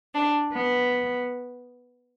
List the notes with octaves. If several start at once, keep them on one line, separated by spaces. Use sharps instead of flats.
D4
B3